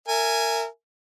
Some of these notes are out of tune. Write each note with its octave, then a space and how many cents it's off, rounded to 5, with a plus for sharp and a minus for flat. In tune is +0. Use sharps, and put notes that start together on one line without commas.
A#4 -25 E5 +5 G#5 +0